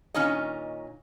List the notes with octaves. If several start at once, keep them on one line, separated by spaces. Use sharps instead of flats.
A#2 D#3 C#4 D#4 C#5 D#5